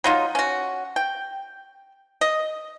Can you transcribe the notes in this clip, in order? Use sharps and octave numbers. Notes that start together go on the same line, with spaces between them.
F#3 D#4 F4
C#4 F#4
G5
D#5